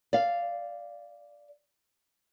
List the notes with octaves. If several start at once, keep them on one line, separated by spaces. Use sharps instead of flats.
D5 F5